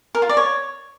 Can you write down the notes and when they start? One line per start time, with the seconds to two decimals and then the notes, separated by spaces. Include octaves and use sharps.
0.15 A#4
0.22 F4
0.29 D5
0.37 C#5